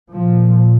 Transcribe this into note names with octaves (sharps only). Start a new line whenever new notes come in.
A#2 F3